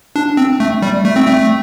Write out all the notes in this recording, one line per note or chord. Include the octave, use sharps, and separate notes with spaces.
D4
C4
A3
G3
A3
C4
A3